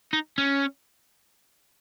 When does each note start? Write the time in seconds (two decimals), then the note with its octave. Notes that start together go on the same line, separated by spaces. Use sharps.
0.13 D#4
0.38 C#4